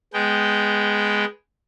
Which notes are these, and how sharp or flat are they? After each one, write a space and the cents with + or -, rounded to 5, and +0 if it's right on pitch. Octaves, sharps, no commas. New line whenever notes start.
G#3 +0 B3 +0 G5 -15